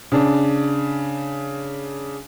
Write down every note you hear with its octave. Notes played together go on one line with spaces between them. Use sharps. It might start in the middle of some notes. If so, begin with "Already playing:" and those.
C#3 D4